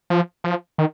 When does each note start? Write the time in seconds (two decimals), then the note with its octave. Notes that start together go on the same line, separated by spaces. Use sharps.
0.10 F3
0.44 F3
0.78 D#3